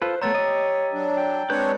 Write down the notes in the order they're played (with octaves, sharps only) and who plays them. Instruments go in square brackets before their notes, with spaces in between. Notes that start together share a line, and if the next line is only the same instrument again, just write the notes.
[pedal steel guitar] F4 A4 B4 [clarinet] C5
[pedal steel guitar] A3 B3 C5 [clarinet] C#5 [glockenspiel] A#5 E6 A6
[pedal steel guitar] G4 D#5
[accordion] F#3 D4
[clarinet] G5
[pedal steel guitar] G#3 B4 G6 [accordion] C4 D4 C#5